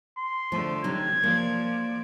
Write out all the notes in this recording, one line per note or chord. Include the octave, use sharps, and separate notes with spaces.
C6
D3 F3 A3
C3 F#3 D#4 G#6
F3 A#3 D5